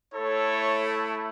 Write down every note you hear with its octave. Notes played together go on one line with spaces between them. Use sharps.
A3 E4 A4 C#5